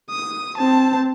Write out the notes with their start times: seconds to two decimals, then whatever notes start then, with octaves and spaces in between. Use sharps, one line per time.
0.10 D#6
0.58 C4 A5